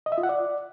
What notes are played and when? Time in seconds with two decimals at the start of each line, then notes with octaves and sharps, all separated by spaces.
0.06 D#5
0.12 E5
0.18 F4
0.23 F#5
0.29 D5